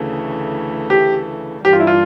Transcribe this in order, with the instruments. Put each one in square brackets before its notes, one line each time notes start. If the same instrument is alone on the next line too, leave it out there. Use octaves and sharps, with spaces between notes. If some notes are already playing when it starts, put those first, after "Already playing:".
Already playing: [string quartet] D2 C#3 E3 A3
[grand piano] G4
[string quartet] G2 E3 G3 A#3 D4 [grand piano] G4
[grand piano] F4
E4
F4